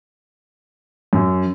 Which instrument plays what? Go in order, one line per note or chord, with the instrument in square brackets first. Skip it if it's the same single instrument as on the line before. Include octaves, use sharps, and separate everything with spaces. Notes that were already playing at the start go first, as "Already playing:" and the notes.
[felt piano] F#2